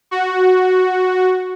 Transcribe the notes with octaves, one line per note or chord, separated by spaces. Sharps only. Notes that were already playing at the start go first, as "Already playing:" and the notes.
F#4